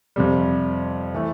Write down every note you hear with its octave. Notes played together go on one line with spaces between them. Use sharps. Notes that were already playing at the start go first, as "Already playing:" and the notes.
F2 C3 G3
E3 A3